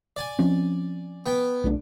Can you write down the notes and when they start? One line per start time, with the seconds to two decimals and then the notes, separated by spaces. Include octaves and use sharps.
0.16 D5 G#5
0.39 F3 C4 C#4
1.26 B3 G5
1.64 B1 A3 D4